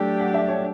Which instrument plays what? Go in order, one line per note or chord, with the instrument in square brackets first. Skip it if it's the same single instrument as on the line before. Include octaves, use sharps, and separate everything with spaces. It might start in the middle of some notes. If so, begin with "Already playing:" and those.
Already playing: [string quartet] F#3 A3 D4 G4 [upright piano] A4 G5
[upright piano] F#5
E5
D5
C#5